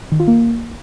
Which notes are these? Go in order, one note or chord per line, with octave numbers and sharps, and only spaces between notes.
D#3
F4
A#3